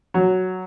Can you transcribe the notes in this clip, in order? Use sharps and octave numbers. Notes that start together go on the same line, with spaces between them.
F#3